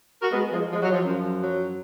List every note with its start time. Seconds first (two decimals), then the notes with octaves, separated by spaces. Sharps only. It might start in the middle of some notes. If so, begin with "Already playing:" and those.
0.22 F#4 A#4
0.32 G#3 B3
0.53 F3 G#3
0.73 F3 G#3
0.82 F#3
0.93 F3
1.03 F#2 F3
1.43 F#3